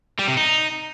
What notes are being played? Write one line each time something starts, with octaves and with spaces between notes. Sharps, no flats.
G3
C3
D#4